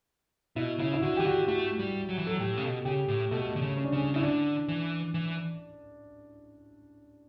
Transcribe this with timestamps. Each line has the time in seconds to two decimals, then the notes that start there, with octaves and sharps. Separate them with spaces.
0.56 B2 E4
0.79 C#3 E4
0.93 E4
1.02 D3 F#4
1.17 E3 G4
1.25 D3 F#4
1.48 A3 F#4
1.79 G3
2.09 F#3
2.18 E3
2.27 F#3 A4
2.40 A2 G4
2.57 C#3
2.62 B2 A4
2.85 C#3 G4
3.08 A2 G4
3.31 B2 A3
3.56 D3
3.62 C#3
3.77 C#4
3.85 D4
3.92 C#3 C#4
4.14 C#3 E4
4.23 D3 D4
4.68 E3
5.14 E3